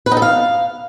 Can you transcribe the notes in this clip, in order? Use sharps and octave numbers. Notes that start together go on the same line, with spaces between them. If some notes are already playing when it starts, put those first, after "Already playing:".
B4
D#4
A4
F5